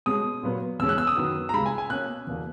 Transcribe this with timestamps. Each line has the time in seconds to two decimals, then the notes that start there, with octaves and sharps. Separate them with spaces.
0.06 B2 G#3 C#4 D#6
0.43 A#2 F#3 B3
0.79 E2 B2 G#3 C#4 E6
0.89 F#6
0.98 E6
1.07 D#6
1.17 F#2 D#3 F#3 B3
1.49 A#5
1.54 C#2 C#3 G#3 B5
1.66 G#5
1.78 G#5
1.89 B2 A#3 C#4 F#6
2.27 E2 B2 A#3